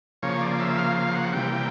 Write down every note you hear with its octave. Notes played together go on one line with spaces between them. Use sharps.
C#3 F3 A#3 C#5
D5
E5
F5
F5
F#5
C3 E3 G3 A#3 G5